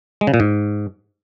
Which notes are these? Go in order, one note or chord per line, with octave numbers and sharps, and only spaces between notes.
G#3
C#3
A#2
G#2